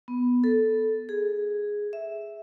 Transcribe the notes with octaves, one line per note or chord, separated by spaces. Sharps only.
B3
A4
G#4
E5